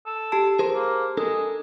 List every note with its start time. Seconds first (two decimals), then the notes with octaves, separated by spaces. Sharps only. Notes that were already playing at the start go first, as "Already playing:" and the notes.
0.06 A4
0.32 G4 A5
0.59 G#4 A#4 C5
0.74 A#3
1.17 G#3 D4 A4 A#4